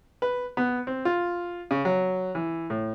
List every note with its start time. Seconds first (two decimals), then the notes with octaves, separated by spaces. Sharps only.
0.22 B4
0.57 B3
0.87 C4
1.05 F4
1.71 C#3
1.85 F#3
2.35 E3
2.70 A2